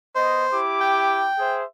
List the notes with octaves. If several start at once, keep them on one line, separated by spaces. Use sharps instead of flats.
B3 C5 D#5
E4 G4 D6
G5
G#4 C5 E5